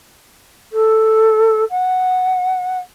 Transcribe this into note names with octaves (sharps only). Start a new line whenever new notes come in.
A4
F#5